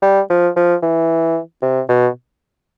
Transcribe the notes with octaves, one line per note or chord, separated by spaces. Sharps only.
G3
F3
F3
E3
C3
B2